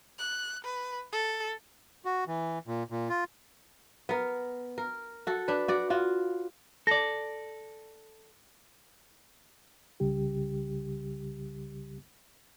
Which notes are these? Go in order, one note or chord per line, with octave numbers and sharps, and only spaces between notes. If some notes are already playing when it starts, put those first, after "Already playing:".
F#6
B4
A4
F#4
E3
A#2
A#2
F4
B3 A#4
A#4
F#4 A4
D4 B4
F#4 D5
F4 F#4
A4 D5 A#6
C2 C#3 G3 G4